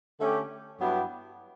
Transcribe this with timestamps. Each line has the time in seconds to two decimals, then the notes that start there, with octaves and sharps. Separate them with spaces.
0.19 D3 A3 C#4 G4
0.80 G2 F#3 B3 E4 G4